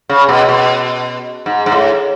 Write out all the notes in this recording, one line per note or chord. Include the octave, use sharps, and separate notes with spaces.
C#3
B2
B2
G#2
G#2
A2